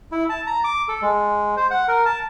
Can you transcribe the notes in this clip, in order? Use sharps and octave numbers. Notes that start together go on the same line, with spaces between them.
E4
A5
A#5
D6
A4
G#3
C5
F#5
A#4
A5